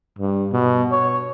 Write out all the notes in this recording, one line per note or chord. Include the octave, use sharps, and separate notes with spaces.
G2
B2
C#5